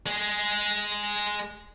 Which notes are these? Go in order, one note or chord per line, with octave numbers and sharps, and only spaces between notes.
G#3 G#4